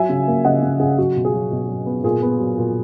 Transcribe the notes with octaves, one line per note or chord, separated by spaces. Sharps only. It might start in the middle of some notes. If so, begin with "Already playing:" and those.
Already playing: F#3 E5 G#5
C#3
A#3
C#3 D#5 F#5
C#3
C#3 G#4
F#3 F#4
B2
G#4
F#3
B2
F#3
B3
A#2 G#4
B3
F#3
A#2